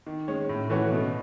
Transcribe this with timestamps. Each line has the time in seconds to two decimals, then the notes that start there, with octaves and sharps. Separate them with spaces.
0.07 D#3
0.28 G#3 C#4
0.49 A2
0.70 E3 A3 C#4 F#4
0.92 B2